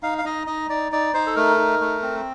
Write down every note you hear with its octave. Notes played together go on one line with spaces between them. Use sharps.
D#4 F5
F5
D#4 D#5
D#4 D#5
D#4 D5
D#4 D5
D#4 C5
A4
A3 A#4
D#4
A3
C4